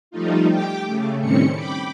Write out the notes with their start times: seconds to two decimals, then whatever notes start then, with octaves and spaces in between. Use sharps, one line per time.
0.11 F3 G3 A3 D#4 F4
0.49 G4 G5 D6
0.86 C#3 A3
1.20 A2 D#3 G3 C4 C#4 C#7
1.54 G5 B5 D6